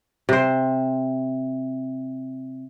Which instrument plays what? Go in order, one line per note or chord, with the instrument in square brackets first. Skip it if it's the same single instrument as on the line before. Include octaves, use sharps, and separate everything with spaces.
[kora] C3 C5